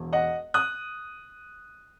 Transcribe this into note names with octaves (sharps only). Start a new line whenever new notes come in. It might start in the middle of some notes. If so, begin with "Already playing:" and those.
Already playing: E1 E2
D#5 F#5
D#6 F#6